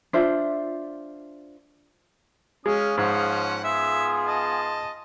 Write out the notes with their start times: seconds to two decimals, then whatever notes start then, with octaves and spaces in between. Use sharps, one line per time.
0.13 D4 F4 C5 E5
2.66 G#3 C#4 F5 D#6
2.97 G#2 F3 C#4 F#5
3.64 B3 F4 G#4 E5
4.27 D#5 A5